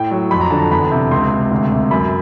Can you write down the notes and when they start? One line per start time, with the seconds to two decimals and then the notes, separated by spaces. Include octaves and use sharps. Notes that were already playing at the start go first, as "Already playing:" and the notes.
Already playing: A2 G5
0.11 F#3
0.31 F2 B5
0.41 A#5
0.51 D3 A5
0.59 A#5
0.71 E2 B5
0.91 C3
1.11 C#2 C6
1.31 C3
1.51 D2
1.72 C3
1.91 F#2 B5